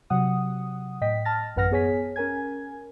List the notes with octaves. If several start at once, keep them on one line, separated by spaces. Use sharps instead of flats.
C3 F#3 F#5 D#6
A2 D#5 G5 B6
A5 F6 A6 A#6
A1 F#2 B4 F#5 F6 A#6
B3 G#4 C#5 G#5 B6
C#4 A#4 G#5 G#6